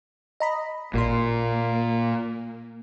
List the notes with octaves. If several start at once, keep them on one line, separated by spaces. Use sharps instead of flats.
D#5 A#5 B5
A1 A#2 A#3 C6